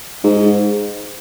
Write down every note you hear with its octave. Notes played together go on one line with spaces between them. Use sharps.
G#2